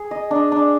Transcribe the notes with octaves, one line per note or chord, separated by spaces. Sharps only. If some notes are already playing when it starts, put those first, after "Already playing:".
Already playing: G#4
D#5
D4
D4